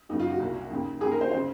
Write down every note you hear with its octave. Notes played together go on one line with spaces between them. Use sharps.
F#1 F#2 C#3 D#4
F4
F#4
C2 A#2
D#2 C#3
D#2 C#3 G#4
A#4
C5
C#3 C5